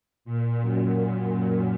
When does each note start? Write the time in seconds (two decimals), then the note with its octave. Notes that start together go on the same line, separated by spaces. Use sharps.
0.25 A#2
0.61 F#2